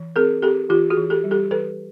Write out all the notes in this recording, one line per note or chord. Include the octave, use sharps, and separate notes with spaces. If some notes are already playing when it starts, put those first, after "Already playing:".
Already playing: E3
C4 G#4 A#4
C4 G4 A4
E3 F4 G4
F#4 G#4
E3
G4 A4
G3
G4 A4
E3 A4 B4